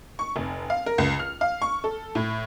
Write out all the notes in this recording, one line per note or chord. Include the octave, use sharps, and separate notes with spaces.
C#6
F1
F5
A#4
C#2
F6
F5
C#6
A4
A2